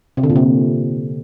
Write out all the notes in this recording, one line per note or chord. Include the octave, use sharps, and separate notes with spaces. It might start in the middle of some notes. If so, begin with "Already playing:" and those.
C3
D3
A#2
C3